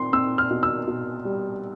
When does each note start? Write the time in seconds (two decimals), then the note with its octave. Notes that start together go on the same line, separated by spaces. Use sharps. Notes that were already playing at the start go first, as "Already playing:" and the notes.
Already playing: C4 C6
0.13 C4 E6
0.38 F6
0.51 B2
0.63 E6
0.87 B2
1.25 G3